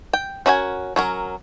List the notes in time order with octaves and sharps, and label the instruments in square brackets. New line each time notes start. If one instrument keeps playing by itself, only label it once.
[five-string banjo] G5
C#4 F#4 A#4 E5 G#5
F#3 C#4 A#4